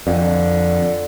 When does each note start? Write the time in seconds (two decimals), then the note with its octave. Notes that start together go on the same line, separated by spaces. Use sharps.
0.07 F2 D3